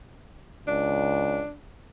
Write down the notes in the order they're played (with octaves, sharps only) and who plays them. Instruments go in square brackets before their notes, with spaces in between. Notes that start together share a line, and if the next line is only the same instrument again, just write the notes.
[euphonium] C#2 [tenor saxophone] D4